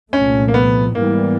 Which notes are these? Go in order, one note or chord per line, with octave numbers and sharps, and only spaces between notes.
C2 A#2 F3 A3 C#4
A#3
B3
G#2 E3 G3 A#3 B3